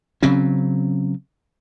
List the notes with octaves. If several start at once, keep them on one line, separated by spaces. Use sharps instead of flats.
C#3 F#3 C4 C#4